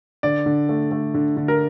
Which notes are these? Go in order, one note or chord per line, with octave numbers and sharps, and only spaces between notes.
D3 D5
D3
A3
A3
D3
D3
A#4